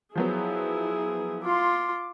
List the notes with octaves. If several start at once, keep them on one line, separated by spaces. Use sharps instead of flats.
F3 F#3 B3 E4 G#4
F4 C6 D6